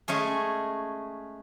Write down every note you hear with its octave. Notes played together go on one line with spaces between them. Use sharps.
G#3 A3 C#4 G#4